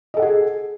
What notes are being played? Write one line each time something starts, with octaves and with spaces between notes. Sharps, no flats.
G#4 A4 D#5 F#5